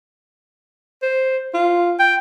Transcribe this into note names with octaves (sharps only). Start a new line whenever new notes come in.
C5
F4
G5